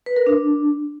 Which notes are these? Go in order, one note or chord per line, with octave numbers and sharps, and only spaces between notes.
B4
A#4
D4